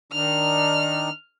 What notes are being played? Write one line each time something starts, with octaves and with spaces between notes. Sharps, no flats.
D#3 D4 D#4 F6